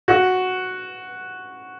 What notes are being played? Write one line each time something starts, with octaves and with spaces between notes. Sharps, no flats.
F#4